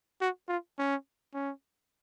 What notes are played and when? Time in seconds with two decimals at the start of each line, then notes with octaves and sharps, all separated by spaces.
0.21 F#4
0.48 F4
0.78 C#4
1.34 C#4